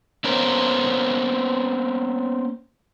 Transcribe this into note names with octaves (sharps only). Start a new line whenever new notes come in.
A#3 B3 C#4 A#4 C5